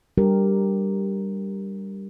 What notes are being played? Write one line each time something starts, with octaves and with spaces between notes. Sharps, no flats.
G3 D4 G4 A#4